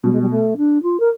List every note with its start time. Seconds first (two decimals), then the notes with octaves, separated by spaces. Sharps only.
0.04 B2 G3
0.12 G#3
0.21 G3
0.30 A3
0.57 D4
0.83 F4
1.00 A#4